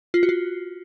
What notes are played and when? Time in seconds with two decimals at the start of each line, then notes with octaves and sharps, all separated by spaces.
0.14 F4
0.23 F#4
0.29 F4